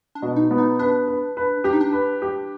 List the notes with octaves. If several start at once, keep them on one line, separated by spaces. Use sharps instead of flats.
D4
B2
D#4
B3
D#4
D4 B4
B4
B4
D4 G4
D#4
D4
B4
G4